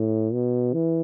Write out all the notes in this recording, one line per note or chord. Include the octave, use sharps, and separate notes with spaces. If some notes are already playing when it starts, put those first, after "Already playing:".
Already playing: A2
B2
E3